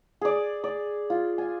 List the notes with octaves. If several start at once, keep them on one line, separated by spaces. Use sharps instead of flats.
G#4 D5
D5
F4
G#5